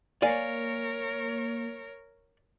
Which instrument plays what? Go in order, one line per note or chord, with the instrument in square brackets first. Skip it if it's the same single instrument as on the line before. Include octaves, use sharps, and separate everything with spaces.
[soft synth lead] A#3 [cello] A#4 C#5 [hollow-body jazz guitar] D5 F5 G#5